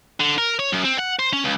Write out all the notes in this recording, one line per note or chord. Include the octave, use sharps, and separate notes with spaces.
D3
A#4
C#5
F#2
C4
F#5
C5
C#4
C#2